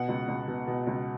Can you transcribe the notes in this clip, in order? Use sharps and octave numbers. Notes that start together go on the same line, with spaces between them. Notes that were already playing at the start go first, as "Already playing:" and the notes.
Already playing: B2 F#5
C#2
C#2
B2
B2
C#2